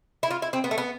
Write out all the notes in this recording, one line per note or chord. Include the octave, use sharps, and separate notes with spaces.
E4
F4
E4
C4
B3
A3
B3